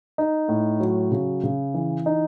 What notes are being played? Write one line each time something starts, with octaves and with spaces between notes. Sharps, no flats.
D#4
A2
F#3
C#3
C#3
E3
D#4